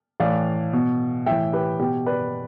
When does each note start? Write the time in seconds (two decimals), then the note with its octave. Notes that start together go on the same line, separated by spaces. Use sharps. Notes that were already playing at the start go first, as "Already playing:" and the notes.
0.20 A2 E3 D5 F5
0.73 B2
1.26 A2 E5 G5
1.31 E3
1.53 G4 B4
1.80 B2 G4
2.06 B4 D5